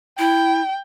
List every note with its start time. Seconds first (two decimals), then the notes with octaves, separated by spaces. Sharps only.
0.19 E4 G5